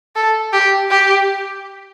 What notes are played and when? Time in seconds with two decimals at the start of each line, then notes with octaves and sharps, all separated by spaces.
0.15 A4
0.53 G4
0.90 G4